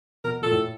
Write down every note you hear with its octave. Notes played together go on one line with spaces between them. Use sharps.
B2 A#4
A#2 A4
A2